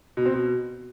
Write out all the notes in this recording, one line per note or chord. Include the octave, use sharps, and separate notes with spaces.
B2
C4
B2